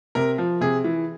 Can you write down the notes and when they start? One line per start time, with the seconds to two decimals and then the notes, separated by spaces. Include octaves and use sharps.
0.15 C3 A#4
0.38 F3
0.61 C3 G#4
0.84 E3